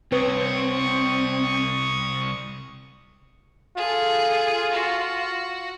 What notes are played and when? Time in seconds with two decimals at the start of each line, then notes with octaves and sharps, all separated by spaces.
0.12 C2 C4 B4 C#5 C#6 D#6
3.77 F4 G#4 A4
4.73 F#4